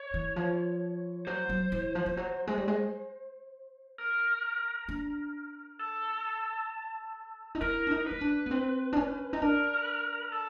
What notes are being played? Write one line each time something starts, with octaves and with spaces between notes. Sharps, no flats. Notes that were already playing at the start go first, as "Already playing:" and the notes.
Already playing: C#5
E3
F3
F#3 C5
F#3
E3
F3
F3
F#3
G#3
G3
G#3
A#4
D4
A4
D#4
E4 A#4
D4
D#4
D#4 B4
D4
B3
C4
D4
C#4
D#4
D4 A#4
A4